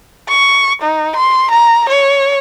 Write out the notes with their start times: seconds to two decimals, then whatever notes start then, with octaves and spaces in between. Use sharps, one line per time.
0.29 C#6
0.82 D#4
1.16 C6
1.51 A#5
1.89 C#5